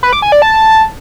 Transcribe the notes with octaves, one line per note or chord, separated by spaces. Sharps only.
B4
D6
G#5
D5
A5